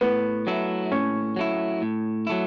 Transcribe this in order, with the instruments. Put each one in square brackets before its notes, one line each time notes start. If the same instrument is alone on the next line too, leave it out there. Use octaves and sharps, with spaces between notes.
[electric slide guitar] A2 [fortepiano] B3
[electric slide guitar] F#3 A3 E4
[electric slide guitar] A2 [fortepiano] C#4
[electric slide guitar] F#3 A3 E4
A2
F#3 A3 E4